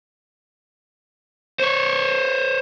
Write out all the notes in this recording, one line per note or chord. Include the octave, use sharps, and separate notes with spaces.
C5 C#5